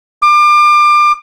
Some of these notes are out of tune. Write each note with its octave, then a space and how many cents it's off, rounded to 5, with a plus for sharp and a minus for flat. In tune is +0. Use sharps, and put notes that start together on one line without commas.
D6 +30